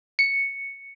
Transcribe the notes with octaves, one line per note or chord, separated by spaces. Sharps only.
C#7